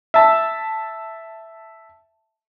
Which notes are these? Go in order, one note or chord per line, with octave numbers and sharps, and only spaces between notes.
E5 A5